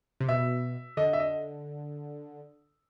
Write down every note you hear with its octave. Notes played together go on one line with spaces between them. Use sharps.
C3
B2 E5
D3 D#5
E5
D#5